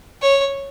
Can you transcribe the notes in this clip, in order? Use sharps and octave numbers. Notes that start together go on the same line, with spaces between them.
C#5